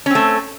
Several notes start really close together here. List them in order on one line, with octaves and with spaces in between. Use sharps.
C#4 C4 A3